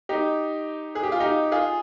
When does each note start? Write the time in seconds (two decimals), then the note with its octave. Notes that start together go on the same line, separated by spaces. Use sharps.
0.09 D#4 G4
0.95 G#4
1.03 G4
1.12 F4
1.20 D#4 G4
1.52 F4 G#4